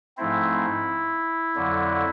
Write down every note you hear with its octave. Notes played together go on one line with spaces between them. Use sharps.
G#2 F3 A3 C4 E4
F2 D3 F#3